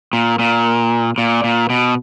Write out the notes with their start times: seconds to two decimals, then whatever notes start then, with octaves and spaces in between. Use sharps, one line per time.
0.13 A#2
0.39 A#2
1.18 A#2
1.44 A#2
1.70 B2